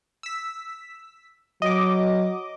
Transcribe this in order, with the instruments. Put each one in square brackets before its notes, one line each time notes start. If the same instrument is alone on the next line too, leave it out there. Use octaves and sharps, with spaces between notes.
[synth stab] E6 B6
[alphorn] F#3 [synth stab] D#5 D6